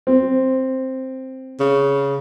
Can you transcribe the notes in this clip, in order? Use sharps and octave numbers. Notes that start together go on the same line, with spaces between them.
C4
C#3